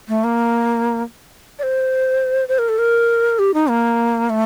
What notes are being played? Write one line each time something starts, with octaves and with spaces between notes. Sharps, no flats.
A3
A#3
D5
C5
C5
A#4
A4
A#4
G4
D#4
A#3
A3